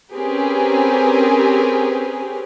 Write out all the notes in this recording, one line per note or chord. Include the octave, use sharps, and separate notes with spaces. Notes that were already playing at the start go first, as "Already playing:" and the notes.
C4 C#4 G4 G#4 A#4 B4